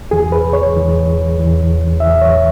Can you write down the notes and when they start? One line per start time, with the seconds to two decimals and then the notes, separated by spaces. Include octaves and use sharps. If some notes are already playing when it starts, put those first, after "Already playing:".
0.11 E2 E3 G#4
0.32 B4
0.53 C#5
0.74 E2 E3
1.37 E2 E3
2.00 E2 E3 E5
2.21 C#5